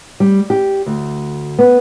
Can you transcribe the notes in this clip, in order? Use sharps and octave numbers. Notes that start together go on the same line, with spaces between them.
G3
G4
D2
B3